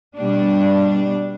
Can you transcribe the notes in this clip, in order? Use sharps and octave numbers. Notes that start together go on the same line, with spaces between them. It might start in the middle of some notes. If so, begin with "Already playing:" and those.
B2 G3 D4